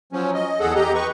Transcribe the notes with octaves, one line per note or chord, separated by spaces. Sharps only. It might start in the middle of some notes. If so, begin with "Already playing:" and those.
F3 F#3 C#4
D#5
E2 G#4 A4 F#5
G4 D#5 A#5
B4 C#6